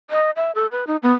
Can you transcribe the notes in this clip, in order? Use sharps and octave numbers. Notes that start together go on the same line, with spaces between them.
D#5
E5
A4
B4
D#4
B3